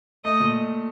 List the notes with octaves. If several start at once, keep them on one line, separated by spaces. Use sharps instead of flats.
A3 D#5
A#2